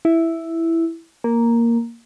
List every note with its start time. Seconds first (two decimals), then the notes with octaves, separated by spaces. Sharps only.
0.05 E4
1.24 A#3